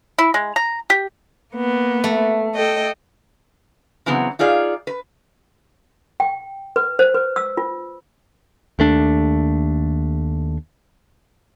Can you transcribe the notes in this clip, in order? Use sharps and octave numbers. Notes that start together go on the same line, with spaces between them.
E4
G#3
A#5
G4
A#3 B3
A3
A4 D#5 G5
C#3 E3 F#3 B3 C4
D#4 F4 G#4 D5 E5 F5
B4
G5
B4
C5
B4
E6
F4
D#2 A3 D4